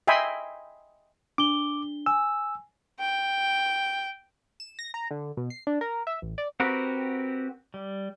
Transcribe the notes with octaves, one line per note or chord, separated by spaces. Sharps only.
D#5 E5 G5 G#5 B5 C6
D4 D6 G7
G#5 E6
G5
E7
A#6
A#5
D3
B2
C7
D4
A#4
E5
A1
D5
C4 F#4 G4 A#4 B4
G3